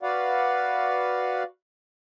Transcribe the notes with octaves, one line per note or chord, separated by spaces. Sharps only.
F#4 B4 D5 F5 F#5